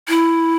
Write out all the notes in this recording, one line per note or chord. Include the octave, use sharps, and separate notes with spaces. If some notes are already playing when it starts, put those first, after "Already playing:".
E4